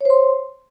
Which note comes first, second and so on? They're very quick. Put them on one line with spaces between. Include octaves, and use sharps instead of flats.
C#5 C5 C6